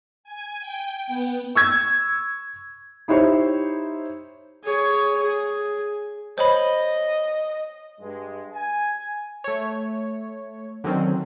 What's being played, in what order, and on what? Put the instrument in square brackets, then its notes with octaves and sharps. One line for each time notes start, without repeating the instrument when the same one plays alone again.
[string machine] G#5
G5
B3
[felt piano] C#6 E6 G#6
D#4 E4 G4 C5 C#5
[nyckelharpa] G#4 C#5
G#4
[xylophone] C5 C#5 B5 [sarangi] D#5
[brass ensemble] G2 G#3
G#5
[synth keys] A3 C#5
D3 D#3 F#3 C4 C#4